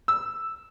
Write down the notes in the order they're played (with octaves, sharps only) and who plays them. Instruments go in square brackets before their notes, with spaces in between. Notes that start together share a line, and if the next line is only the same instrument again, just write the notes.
[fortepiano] E6